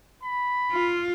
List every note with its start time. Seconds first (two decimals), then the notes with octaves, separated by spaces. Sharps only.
0.23 B5
0.72 F4